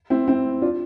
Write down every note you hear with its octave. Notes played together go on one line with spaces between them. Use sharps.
C4 E4
C4 E4
D4 F4